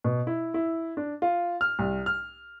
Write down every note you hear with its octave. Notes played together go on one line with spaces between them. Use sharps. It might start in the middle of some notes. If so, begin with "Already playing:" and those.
B2
E4
E4
D4
F4
F6
C2
F6